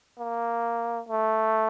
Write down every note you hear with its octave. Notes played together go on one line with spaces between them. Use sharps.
A#3
A3